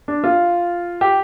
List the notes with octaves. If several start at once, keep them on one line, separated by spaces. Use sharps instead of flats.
D4
F4
G4